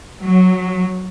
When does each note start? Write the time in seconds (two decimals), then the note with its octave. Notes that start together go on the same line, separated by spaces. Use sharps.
0.23 F#3